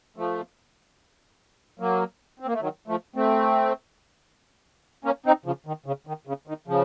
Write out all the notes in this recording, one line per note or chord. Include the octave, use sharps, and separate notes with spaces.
F3 A3
F#3 A#3
C4
A#3
A3
D#3 F#3
F3 A3
A3 C4
A#3 C#4
C4 D#4
C#3 F3
D#3
C#3
D#3
C#3
D#3
C#3 F3